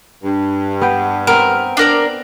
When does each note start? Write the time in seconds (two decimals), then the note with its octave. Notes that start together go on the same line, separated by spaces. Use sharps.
0.24 G2
0.81 B3 G5
1.27 B3 C4 A#4
1.77 D4 A#4 D5